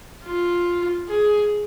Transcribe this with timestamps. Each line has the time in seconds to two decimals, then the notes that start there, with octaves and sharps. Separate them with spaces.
0.25 F4
1.09 G#4